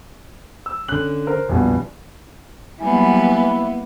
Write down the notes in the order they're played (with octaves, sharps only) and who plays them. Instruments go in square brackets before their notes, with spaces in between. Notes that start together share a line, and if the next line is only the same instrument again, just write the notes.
[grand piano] E6
[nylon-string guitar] D3 C#4 [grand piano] F#6 F#7
[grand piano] A#4 C5
[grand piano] A#1 G2 B2 [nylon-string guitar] E2
[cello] F#3 G3 [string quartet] A#3 B3 [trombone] E4 [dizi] G#5